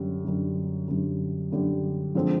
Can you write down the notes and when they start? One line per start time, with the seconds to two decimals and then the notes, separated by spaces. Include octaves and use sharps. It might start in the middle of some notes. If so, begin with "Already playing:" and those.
Already playing: F#2 D3 G3
0.24 F#2 D3 G3
0.88 F#2 D3 G3
1.52 F#2 D3 G3
2.15 D3 F3 G#3 C4